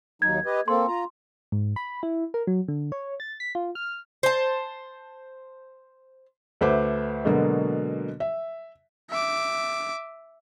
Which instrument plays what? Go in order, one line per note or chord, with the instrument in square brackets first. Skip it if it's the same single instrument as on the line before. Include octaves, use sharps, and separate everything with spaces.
[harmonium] D#2 F#3 D#4 [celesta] G#6
[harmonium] G4 B4 D#5
[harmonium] A#3 C4 A4 [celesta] C6
[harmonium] F4 A#5
[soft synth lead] G#2
B5
E4
A#4
F#3
D3
C#5
A6
B6
F4
F6
[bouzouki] C5 A5
[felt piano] D2 A3 B4 C5 E5 D6
B2 D3 F#3 G#3 A#3 B3
E5
[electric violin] E5 D6